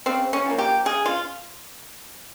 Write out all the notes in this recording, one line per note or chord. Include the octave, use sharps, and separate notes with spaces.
C#3 C4
C#4
F3 A#3
G4
C#3 G#4
F4